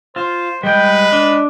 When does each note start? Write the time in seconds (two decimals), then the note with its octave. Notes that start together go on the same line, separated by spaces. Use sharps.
0.16 F4 C5
0.63 G3 G#3 B4 G5
1.12 D4